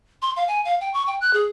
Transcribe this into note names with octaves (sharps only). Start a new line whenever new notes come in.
C6
F5
G#5
F5
G5
C#6
G5
F#6
G#4